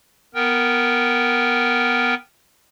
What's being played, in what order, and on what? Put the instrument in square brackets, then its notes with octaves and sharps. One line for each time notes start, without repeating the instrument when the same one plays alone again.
[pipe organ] B3 A#4 G5